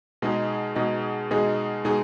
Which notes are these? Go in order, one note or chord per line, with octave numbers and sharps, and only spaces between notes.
B2 G#3 D#4 G#4
B2 G#3 D#4 G#4
B2 G#3 D#4 G#4
B2 G#3 D#4 G#4